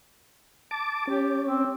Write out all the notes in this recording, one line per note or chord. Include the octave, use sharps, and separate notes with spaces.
A5 D6
C#4 G4
C4